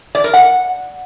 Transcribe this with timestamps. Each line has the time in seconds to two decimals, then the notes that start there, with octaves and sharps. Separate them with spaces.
0.15 D5
0.24 A#4
0.33 F#5